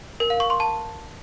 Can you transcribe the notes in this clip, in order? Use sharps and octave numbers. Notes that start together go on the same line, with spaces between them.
A#4
F5
C#6
C6
A5